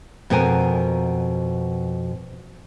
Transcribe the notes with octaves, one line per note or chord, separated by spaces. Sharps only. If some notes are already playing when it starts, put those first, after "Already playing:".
F2 B2 B3 A#4 G#5